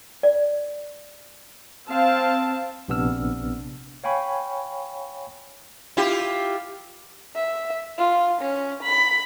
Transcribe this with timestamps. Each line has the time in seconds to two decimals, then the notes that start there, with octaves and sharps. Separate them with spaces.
0.23 D5
1.89 C4 F5 A5
2.88 A#1 C3 B3 D4 E6 F6
4.04 C#5 F5 G5 G#5 B5 C#6
5.97 E4 F4 G4
7.36 E5
7.98 F4
8.42 C#4
8.83 B5